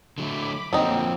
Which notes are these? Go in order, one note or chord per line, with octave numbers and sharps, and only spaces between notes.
D3 F#3 A3 B5 D6
F2 D3 F3 F#3 A#3 C4 D#4